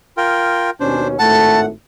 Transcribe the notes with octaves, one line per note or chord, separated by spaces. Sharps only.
F4 A#4 G5
D#2 B2 C#4 D4 C5
G#1 A2 A3 F#5 A5